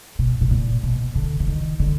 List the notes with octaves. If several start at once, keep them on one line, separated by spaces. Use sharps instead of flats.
B2
B2
A#2
B2
D3
D3
D#3
D3